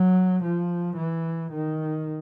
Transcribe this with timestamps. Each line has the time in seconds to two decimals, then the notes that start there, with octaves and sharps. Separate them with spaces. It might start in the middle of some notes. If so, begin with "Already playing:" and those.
Already playing: F#3
0.43 F3
0.96 E3
1.52 D#3